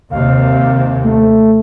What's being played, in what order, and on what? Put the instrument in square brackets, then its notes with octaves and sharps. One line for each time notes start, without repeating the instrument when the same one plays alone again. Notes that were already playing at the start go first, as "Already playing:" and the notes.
[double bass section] D#2 C3 [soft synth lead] F5
[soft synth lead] A3